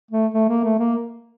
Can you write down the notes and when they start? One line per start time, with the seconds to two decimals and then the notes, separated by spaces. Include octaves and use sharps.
0.11 A3
0.34 A3
0.49 A#3
0.64 A3
0.79 A#3